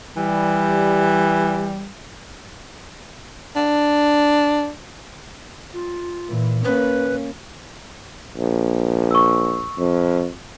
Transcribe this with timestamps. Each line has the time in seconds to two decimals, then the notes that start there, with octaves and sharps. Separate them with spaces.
0.17 E3 G3
3.56 D4
5.73 F4
6.28 A#2 E3
6.64 A#3 C#4 B4
8.37 A#1
9.11 C#6 E6
9.79 F2